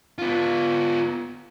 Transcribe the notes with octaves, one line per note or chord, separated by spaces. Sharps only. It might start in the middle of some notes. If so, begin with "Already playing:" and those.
B3 F4